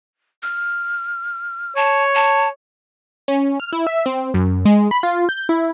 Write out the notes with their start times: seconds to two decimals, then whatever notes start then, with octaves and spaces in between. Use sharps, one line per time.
0.43 F6
1.76 C#5 A5
2.15 A5
3.28 C#4
3.60 F6
3.73 E4
3.87 E5
4.06 C4
4.34 F#2
4.65 G#3
4.91 B5
5.03 F4
5.29 G6
5.49 E4